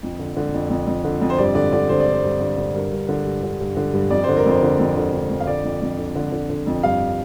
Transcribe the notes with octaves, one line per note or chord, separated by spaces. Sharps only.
F2
D3
D3
F2
F2
F2
D3
F2
C5
G2 D5
D3 D5
D3 D5
D3 C5
D5
D3
C5
G2
D3
D3
G2 A#4
G2
D3
G2
D3
G2
D3
G2
F2 D5
C5
D3
A#4
F2 C5
D3
F2
D3
D3
F2
F5
D3 D5
F2
F2
D3
D3
D3
D3
F2
G2 F5